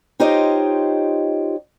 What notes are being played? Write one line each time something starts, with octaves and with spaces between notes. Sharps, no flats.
D#4 F4 G4 C5 C#5 D#5